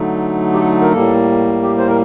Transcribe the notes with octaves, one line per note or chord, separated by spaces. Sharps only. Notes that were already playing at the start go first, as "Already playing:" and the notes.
Already playing: D3 F#3 A3 D#4
G4
A4
A#4
A2 G3 A#3 A4
G4
C5
A#4